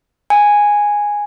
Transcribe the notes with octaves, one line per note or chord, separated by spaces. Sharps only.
G#5